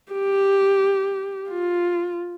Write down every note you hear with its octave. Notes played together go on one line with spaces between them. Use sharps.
G4
F4